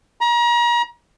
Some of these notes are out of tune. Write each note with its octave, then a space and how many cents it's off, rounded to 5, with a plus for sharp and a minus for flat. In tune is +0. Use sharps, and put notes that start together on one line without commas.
A#5 +35